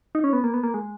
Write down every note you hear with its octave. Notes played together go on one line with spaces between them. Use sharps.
D#4
C#4
B3
A#3
B3
A#3
G#3